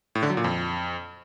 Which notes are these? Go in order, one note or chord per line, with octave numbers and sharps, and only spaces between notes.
A2
D3
F#3
A#2
F2